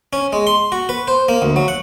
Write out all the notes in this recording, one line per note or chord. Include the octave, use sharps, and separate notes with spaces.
C#4
G#3
C6
F#4
B4
C5
A#3
D2
F#3
F#5